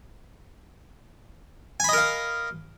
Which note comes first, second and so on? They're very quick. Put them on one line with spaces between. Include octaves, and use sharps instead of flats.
G#5 B5 D#5 A#4 F5